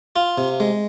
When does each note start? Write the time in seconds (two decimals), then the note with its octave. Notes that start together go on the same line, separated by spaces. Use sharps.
0.16 F4
0.38 C3
0.60 G#3